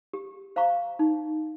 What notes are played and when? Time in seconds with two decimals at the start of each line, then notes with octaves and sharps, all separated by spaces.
0.13 G4
0.56 C5 F5 A#5 C#6
0.99 D#4